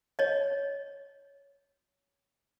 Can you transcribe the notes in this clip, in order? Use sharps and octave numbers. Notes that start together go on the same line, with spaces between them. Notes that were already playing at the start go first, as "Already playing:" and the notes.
C#5 D#5